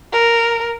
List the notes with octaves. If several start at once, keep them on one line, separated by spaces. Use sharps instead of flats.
A#4